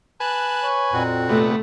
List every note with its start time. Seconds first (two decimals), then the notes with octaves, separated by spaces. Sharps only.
0.20 B4 G#5 A5 F#6
0.64 C#5
0.93 F2 A#2 C4 F#4
1.29 C3 A3 B3